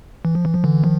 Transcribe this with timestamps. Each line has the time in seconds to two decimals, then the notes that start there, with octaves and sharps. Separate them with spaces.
0.25 E3
0.35 F3
0.45 E3
0.54 F3
0.64 D3 E3
0.84 D#3 F3